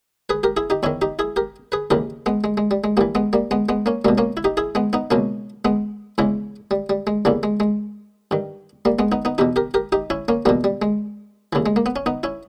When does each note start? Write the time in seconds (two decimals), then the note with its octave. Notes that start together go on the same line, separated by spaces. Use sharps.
0.29 G#4 B4
0.43 G4 A#4
0.57 E4 G#4
0.70 D#4 G4
0.83 E2 D#3 C#4 E4
1.02 D#4 G4
1.19 E4 G#4
1.36 G4 A#4
1.72 G#4 B4
1.91 D#2 C#3 E3 G4 A#4
2.26 G#3 B3
2.44 G#3
2.57 G#3
2.71 G3
2.84 G#3
2.97 G2 E3 G3 A#3
3.15 G#3 B3
3.33 G3 A#3
3.51 G#3 B3
3.69 G#3 B3
3.86 A#3 C#4
4.05 C#2 B2 G3 A#3
4.18 A#3 C#4
4.37 E4
4.44 D#4 G4
4.57 E4 G#4
4.75 G#3 B3
4.93 B3 D#4
5.11 C#2 B2 A#3 C#4
5.65 G#3 B3
6.18 E2 C#3 E3 G#3
6.71 G3
6.90 G3
7.07 G#3
7.25 E2 C#3 E3 G3 A#3
7.43 G#3
7.60 G#3
8.31 G2 D#3
8.85 G3 A#3
8.99 G#3 B3
9.12 B3 D#4
9.25 B3 D#4
9.38 E2 B2 D#4 G4
9.56 G4 A#4
9.74 G4 A#4
9.92 D#4 G4
10.10 C#4 E4
10.28 A#3 C#4
10.46 E2 B2 G3 A#3
10.64 G3
10.82 G#3
11.53 D#2 C#3 E3
11.66 G#3
11.76 A#3
11.86 B3
11.96 C#4
12.06 B3 D#4
12.23 C#4 E4